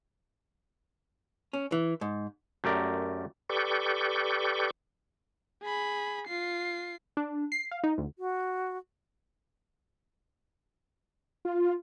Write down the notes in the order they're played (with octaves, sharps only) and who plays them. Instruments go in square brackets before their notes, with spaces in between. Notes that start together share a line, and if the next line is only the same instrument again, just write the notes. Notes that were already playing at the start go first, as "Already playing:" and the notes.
[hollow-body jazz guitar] C#4
E3
G#2
[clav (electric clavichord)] F#2 A3 G4 A#4 D5
[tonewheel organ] G4 A4 B4 D5 C#6 G6
[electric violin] G#4 B5
F4 C7
[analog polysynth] D4
C7
F5
D#4
D2
[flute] F#4
[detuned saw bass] F4